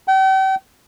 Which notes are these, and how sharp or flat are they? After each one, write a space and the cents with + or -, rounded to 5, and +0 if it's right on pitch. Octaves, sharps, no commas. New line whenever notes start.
G5 -40